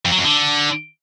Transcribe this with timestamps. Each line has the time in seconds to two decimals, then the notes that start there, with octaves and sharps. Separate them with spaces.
0.05 F2
0.12 F#3
0.18 F2
0.25 D3